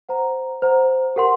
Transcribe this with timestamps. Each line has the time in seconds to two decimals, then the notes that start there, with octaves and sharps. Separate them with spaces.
0.09 C5 F#5 A#5
0.62 C5 F#5 A#5
1.16 G4 A#4 F#5 C6